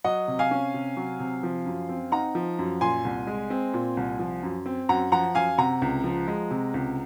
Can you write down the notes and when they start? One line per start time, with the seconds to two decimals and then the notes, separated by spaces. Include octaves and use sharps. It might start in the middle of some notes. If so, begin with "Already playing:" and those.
0.04 F#3 D#5 F#5
0.28 C3
0.39 F5 G#5
0.51 C#4
0.74 C3
0.97 F#3
1.20 C3
1.43 F3
1.66 F#2
1.89 C4
2.12 D#4 F#5 A#5
2.35 F3
2.59 F#2
2.81 A#2 G#5 C6
3.05 C2
3.27 G#3
3.50 C4
3.74 A#2
3.97 C2
4.19 F3
4.43 F#2
4.66 C4
4.89 F#2 F#5 A#5
5.12 F3 F#5 A#5
5.35 F#2 F5 G#5
5.58 C3 F#5 A#5
5.82 C#2
6.04 F3
6.28 G#3
6.51 C3
6.74 C#2